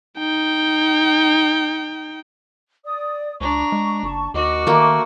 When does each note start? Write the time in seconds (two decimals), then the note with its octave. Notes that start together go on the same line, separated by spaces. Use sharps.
0.19 D#4 G5
2.85 D5 D#6
3.41 C#2 D4 A#5 C#6
3.72 G#3
4.03 F#1 A5 C#6
4.34 D#2 F#4 A#4 D#5 D6
4.67 D#3 A3 A#3